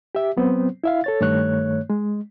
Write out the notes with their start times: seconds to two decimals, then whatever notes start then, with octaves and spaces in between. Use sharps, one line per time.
0.15 G4 E5
0.37 F#3 B3 C4 C5
0.84 E4 E5 F5
1.04 A4 C#5 A6
1.21 G2 D#3 A3 C#5 F#6
1.90 G#3